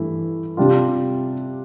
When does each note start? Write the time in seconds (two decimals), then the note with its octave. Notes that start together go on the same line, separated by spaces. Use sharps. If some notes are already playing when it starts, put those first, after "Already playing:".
Already playing: G2 E3 A3 E4
0.57 C3 G3 D4 F4